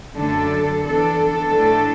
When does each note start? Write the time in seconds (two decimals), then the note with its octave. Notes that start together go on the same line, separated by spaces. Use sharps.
0.16 F#2 D3 A3 D4 A4
0.83 E2 E3 D4 A4
1.50 A2 A3 D4